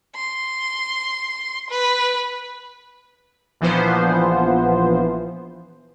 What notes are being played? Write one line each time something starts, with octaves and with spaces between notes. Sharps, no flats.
C6
B4
A#1 E3 F3 B3 C5